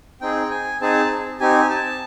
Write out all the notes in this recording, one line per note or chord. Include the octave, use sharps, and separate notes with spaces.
C4 D#4 G#4 G5
G#5
C4 D#4 G#4 A5
C4 D#4 G4 G#5
A5